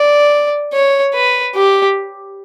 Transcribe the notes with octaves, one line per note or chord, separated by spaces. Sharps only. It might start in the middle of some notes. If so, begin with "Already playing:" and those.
Already playing: D5
C#5
B4
G4